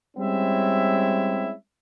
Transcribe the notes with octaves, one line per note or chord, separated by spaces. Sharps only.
G3 G#3 C4 C#4 E4 E5